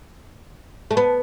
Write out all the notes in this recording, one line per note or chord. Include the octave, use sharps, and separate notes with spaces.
A3
B3